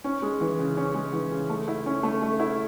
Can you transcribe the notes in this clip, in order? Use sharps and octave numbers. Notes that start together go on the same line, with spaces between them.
C#4
G#3
E3
C#3
C#4
G#3
E3
C#3
A3
E4
C#4
A3
A3
E4